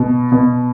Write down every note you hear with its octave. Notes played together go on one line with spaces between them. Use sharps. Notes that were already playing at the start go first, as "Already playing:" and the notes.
Already playing: B2
B2